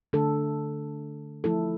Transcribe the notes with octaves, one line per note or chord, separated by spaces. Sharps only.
D3 A3 D4 A4
F3 A3 E4 A4